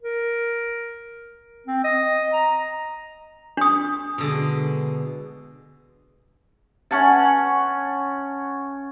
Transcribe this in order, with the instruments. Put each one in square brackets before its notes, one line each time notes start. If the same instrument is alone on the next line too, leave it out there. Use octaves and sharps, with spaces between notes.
[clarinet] A#4
C4
D#5
A#5
[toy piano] D4 D#6
[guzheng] B2 D3 G#3
[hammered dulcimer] C#4 F#5 G#5 A5